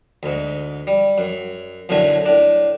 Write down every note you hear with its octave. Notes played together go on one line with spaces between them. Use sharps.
D2 G#2
G3
F#2
B1 F#2 A2 D3 A3 G#5
A2 D4